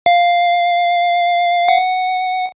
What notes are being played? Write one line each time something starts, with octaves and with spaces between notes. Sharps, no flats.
F5
F#5